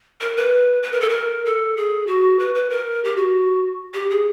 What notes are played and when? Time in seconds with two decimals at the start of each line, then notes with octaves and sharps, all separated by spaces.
0.21 A#4
0.37 B4
0.83 B4
0.92 A#4
1.01 A4
1.09 A#4
1.45 A4
1.77 G#4
2.07 F#4
2.39 B4
2.55 B4
2.70 A#4
3.04 G4
3.16 F#4
3.94 G4
4.10 G#4